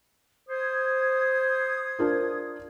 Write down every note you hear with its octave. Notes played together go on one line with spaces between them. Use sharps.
C5 D#6 G#6
D4 F4 A#4